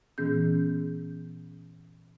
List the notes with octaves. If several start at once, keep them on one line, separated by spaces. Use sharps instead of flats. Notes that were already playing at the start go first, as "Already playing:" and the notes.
A#2 E3 B3 C#4 G#4 G6